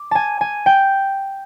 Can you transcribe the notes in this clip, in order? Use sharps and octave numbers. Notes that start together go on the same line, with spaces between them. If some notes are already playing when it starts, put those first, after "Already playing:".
Already playing: D6
G#5 A5
G#5
G5